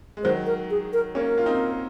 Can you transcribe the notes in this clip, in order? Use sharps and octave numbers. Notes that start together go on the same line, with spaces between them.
G#3
D#3 F#3 C5
A#4
G#4
A#4
A#3 C#4 A#4
F4
C4 D#4